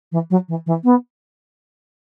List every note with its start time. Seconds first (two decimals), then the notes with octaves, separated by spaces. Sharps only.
0.12 E3
0.30 F#3
0.48 E3
0.66 E3
0.84 B3